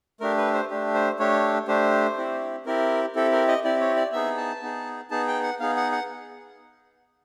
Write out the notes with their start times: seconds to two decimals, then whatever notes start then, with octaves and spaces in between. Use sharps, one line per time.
0.20 A3 D4 G4 A#4
0.38 B4
0.54 C5
0.70 A3 D4 G4
0.94 C5
1.19 A3 D4 G4 C#5
1.68 A3 D4 G4 C5
2.17 C4 E4 G4
2.66 C4 E4 G4 A#4
3.15 C4 E4 G4 A4
3.32 A#4
3.48 D#5
3.64 C4 E4 G4 D5
3.81 C#5
3.96 D5
4.12 B3 D#4 G#4 E5
4.37 A5
4.62 B3 D#4 G#4
5.11 B3 D#4 G#4 A5
5.28 G5
5.43 F#5
5.60 B3 D#4 G#4 F5
5.76 F#5
5.92 F#5